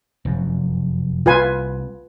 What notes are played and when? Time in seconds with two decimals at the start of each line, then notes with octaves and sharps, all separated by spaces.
0.25 F1 F#2
1.26 C2 F4 B4 G#5